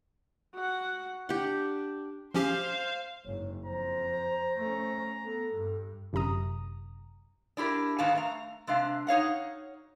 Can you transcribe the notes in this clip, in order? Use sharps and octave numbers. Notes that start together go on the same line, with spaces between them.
F#4 F#5
D4 G4 F#5
F3 C#4 G4 C5 F5
F#1 G#2 C#5
F2 C5 A#5
A3 C#4
B3 A4
G2
G1 F#2 C3 A#5 D#6
D4 E4 G4 A#4 D5
G#2 D#3 C#4 B4 F5 A5
A3 F5 A#5
C3 G#3 D4 F5
D#4 C#5 F5 F#5